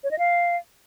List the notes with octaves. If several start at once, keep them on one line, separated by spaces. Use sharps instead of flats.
C#5
D#5
F5